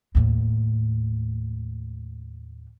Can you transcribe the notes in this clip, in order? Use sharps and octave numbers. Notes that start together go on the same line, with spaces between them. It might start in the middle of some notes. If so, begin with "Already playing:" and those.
D#2 A2